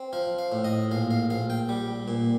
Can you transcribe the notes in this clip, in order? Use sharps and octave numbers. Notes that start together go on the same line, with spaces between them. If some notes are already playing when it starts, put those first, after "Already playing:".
Already playing: C4
F3 F5
F5
A2
D#5
A#1 F5
F5
A#1 F5
G5
G3
A#2